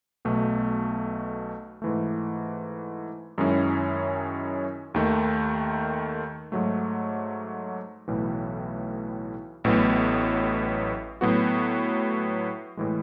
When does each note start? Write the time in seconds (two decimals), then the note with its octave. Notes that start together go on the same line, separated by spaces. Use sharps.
0.25 B1 B2 A3
1.82 G#2 E3 A3
3.38 F#2 D#3 G#3 C#4 E4
4.94 D#2 D#3 A3
6.52 G#2 F#3 A3
8.08 B1 A2 E3
9.64 A1 A2 F#3 B3
11.21 A2 F#3 B3 F#4
12.77 A2 E3 G#3